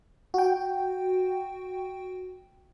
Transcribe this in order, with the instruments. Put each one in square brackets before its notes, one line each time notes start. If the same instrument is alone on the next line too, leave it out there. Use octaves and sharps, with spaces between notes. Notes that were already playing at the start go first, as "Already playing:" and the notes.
[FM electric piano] F#4 G5